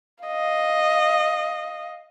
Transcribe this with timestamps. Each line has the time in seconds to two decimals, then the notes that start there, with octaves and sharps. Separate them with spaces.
0.24 D#5 F5